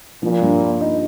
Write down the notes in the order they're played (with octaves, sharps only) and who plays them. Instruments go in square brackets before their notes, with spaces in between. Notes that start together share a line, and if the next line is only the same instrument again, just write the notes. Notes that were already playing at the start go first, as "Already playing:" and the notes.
[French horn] A#2 [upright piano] F3
[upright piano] G2
A#3
D#4